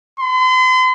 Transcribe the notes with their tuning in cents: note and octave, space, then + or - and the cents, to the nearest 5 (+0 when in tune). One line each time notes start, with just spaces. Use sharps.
C6 -40